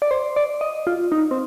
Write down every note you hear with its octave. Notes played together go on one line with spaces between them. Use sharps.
D5
C5
D5
D#5
F4
D#4
C4